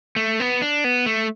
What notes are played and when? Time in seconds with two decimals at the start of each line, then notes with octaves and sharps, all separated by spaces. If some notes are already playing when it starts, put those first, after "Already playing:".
0.16 A3
0.40 B3
0.62 D4
0.84 B3
1.06 A3